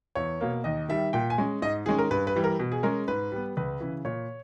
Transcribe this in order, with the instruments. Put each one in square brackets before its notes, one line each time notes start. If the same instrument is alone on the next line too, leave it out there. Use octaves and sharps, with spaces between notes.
[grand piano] E2 C#5
B2 A#3
D#2 D#5
D#3 G3 E5
A#2 G5
G#5
G#3 C#4
G#2 D#5
D#3 G#3 C#4 G#4
A#4
G2 B4
B4
E3 G3
A#4
B2
G#4
G#3 C#4 A#4
G#2 B4
G3 B3
C#2 B4
C#3 E3
A#2 C#5